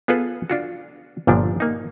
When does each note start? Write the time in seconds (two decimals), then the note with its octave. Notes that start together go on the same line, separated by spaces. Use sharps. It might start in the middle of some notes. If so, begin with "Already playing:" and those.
0.08 B3 F4 G#4 A4 B4
0.50 D4 F4 F#4
1.27 G1 A#2 D3 F3 D4
1.60 A#3 D#4